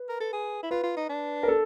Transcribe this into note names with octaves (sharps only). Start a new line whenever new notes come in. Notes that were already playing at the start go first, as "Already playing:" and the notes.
Already playing: B4
A#4
A4
G#4
E4
F4 B4
F4
D#4
D4
A#4
A4